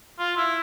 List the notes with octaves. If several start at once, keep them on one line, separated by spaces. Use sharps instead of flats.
F4
E4